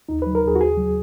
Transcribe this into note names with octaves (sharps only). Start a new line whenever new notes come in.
D#2 D#4
B4
F#3
A#4
D#2 G#4
F#4
C#2 G#4
F#3